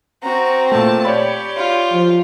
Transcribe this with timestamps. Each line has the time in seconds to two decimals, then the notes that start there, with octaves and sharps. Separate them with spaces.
0.23 C4 F#4 A#5
0.72 A#2 A3 A5
1.05 G4 C#5 D5 B5
1.57 F4
1.93 F3